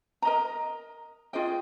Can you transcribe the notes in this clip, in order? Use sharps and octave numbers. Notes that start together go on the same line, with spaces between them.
A#4 D#5 A#5
F4 G#4 D#5 G5